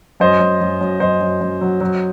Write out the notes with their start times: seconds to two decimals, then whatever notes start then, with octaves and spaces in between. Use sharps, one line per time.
0.20 F#2 C5 D#5
0.40 F#2
0.61 F#2
0.81 F#2
1.00 F#2 C5 D#5
1.21 F#2
1.41 F#2
1.61 F#3
1.81 F#3